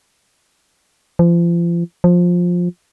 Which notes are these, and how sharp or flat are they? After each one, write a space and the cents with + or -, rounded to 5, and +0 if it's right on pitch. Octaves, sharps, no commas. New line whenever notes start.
F3 -35
F3 +15